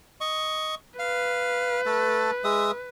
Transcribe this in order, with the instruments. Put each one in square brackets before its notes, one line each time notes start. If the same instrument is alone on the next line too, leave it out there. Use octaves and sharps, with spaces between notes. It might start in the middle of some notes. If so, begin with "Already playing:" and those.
[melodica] D#5 C#6
[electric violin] B4 [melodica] F5
[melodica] A3 A4 A5
G#3 E5 D#6